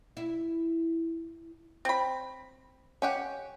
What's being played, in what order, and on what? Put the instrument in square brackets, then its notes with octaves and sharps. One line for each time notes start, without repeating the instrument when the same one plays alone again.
[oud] E4
[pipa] C4 B5
[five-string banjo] C#4 G4 F#5